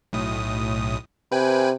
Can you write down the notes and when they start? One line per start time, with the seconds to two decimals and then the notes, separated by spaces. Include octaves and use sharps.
0.13 B1 A2 D#6
1.32 C3 B4 G5 G#5